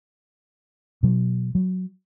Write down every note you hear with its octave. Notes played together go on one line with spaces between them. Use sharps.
B2 F#3
F#3